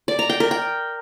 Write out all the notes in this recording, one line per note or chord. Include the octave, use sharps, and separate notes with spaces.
D5
A#5
G5
A#4
G5